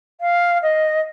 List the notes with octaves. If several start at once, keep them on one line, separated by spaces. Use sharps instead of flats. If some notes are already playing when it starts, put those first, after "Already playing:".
F5
D#5